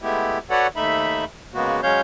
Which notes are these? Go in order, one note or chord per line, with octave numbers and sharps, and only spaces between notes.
G#3 A3 B3 E4 G4
F#4 A4 B4 C#5 D5 F#5
D#2 A3 D#4 E5 B5
C#3 G#3 A#3 B3 F#4
F#3 G#3 C#4 C#5 F5 G6